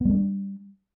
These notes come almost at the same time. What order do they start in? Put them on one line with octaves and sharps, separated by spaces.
B3 G3 A3 D4